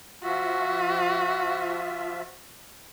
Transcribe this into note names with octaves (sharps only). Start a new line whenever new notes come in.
F3 F4 F#4 E5